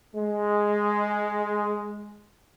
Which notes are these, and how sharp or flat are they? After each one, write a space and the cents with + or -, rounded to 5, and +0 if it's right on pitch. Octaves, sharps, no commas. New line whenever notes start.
G#3 +0